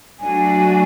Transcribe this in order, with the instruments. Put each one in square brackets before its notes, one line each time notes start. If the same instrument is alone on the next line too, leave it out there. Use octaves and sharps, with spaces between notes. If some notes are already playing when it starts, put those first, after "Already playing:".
[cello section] F#3 A3 D4 F#4 [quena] G#5